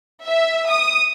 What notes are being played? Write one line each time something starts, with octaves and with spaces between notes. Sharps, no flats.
E5
D#6